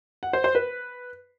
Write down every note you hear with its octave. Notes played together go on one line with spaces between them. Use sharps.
F#5
C5
C5
B4